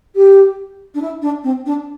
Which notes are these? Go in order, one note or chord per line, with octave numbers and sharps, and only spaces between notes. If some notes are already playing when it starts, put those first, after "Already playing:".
G4
D4
E4
D4
C4
D4